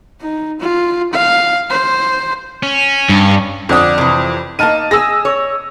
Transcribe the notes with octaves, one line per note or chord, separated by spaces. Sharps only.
D#4
F4
F5
C5
C#4
G2
F2 D3 D5 D#6
C3 E3
A#3 D#4 A5 F6 D#7
G#4 E6 A#6
C#5